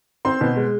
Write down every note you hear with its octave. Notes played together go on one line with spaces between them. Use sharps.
C4 C6
B2
G#3